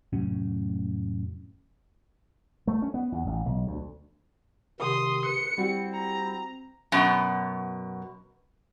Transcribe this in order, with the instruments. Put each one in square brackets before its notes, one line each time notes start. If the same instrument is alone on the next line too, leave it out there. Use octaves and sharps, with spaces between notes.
[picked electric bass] F1 A2 F#3 C#4
[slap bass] A3
C#4
B3
E2
A1
B1
D2
[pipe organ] C3 D#3 [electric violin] C6 D#6
[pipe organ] B4 [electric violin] C#7
[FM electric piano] G3 F#4 [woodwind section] C4 [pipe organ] E4
[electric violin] A#5
[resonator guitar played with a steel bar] F#2 B2